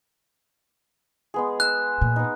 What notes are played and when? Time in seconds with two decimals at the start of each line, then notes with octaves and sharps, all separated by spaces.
1.34 G#3 B3 G#4
1.60 E6 F#6
2.01 A#2
2.16 B3 D#4